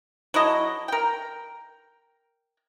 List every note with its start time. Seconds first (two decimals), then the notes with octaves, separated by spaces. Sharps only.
0.34 F#3 E4 A4 D#5
0.88 A#4 G5